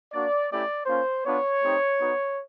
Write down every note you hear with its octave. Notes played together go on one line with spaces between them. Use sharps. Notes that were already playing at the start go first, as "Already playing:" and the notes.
A#3 D4 F#4 D5
A3 C#4 E4 G4 D5
A#3 C#4 F4 C5
B3 D4 F4 C#5
A3 C4 D#4 G4
B3 D#4 F#4